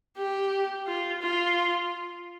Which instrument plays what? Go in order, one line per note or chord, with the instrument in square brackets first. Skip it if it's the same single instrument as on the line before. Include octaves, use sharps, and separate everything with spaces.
[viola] G4
F4
F4